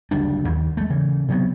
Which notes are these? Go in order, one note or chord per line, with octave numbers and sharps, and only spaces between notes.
F#1 D2 G3 D4
D#2
G#3 A3
C#3 E3
C3 F#3 B3